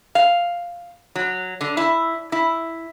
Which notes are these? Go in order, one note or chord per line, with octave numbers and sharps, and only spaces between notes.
F5
F#3
D3
E4
E4